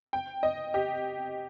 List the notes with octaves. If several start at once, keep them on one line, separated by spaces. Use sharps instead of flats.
G5
D#5
G4